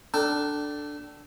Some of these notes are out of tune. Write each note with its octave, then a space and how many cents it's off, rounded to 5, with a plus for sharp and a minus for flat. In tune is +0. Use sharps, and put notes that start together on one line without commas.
D4 +0 A4 +0 G5 -35